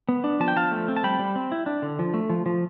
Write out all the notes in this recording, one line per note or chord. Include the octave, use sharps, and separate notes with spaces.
B3
D4
F3 A5
G5
F3 F5 A5
A3
C4
A5
G3 G5 B5
G3
C4
E4
D4
D3
F3
A3
F3
F3